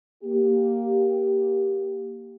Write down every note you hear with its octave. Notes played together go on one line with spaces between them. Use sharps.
A#3 G4